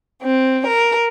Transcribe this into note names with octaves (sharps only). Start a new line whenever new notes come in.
C4
A#4